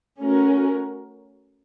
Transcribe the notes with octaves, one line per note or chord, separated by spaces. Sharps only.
A3 C#4 F#4 A#4